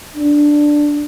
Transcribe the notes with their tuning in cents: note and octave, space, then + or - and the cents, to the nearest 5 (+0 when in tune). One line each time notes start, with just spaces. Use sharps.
D4 +5